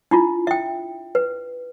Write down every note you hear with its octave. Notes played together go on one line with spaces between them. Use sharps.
D4 E4 F4
E5 G5
B4